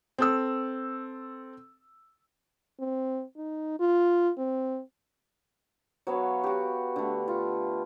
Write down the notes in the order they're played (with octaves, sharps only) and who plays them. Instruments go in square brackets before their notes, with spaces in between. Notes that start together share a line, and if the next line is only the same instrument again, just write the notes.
[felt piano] C4 A4 E6
[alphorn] C4
D#4
F4
C4
[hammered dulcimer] F#3 B3 C#5 F5
F#4 G4
D3 A3
F4